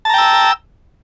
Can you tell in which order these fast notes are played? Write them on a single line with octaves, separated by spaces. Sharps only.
A5 A#5 G5 E6